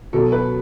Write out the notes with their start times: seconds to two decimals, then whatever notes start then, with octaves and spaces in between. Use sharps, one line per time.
0.13 B2 F#3 A4
0.32 B4